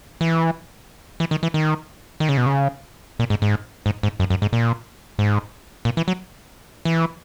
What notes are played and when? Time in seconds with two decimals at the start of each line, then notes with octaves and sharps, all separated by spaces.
0.21 E3
1.20 E3
1.31 D#3
1.43 E3
1.54 D#3
2.20 D#3
2.29 C#3
2.37 B2
2.46 C#3
3.19 A#2
3.30 G#2
3.42 G#2
3.86 G#2
4.03 G#2
4.20 F#2
4.30 F#2
4.42 G#2
4.53 A#2
5.19 G#2
5.85 A#2
5.97 E3
6.08 F#3
6.85 E3